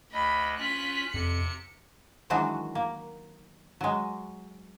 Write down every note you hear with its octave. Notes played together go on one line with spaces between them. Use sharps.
D2 D#5 B5
C#4 F4 F#6 B6
F2 C3 C#7
D#3 E3 F#3 G#3 D4 F#4
A#3
F#3 G#3